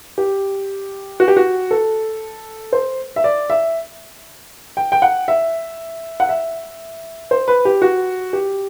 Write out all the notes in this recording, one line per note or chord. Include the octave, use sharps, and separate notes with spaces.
G4
F#4
G4
F#4
A4
C5
E5
D5
E5
G5
G5
F#5
E5
F#5
E5
C5
B4
G4
F#4
G4